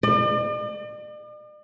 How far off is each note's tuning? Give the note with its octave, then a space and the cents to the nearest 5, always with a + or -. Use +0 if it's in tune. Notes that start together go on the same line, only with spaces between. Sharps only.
D5 +45